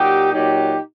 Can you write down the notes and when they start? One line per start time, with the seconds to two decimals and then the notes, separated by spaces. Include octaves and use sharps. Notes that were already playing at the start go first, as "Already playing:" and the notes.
Already playing: A#2 F#3 D#4 G4
0.32 A#2 F#3 D#4 G4